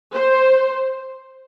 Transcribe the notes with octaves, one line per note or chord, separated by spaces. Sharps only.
C5